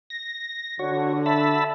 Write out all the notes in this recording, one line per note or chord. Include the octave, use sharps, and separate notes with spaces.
A#6
D3 F#4 C#5
E5 A5 B5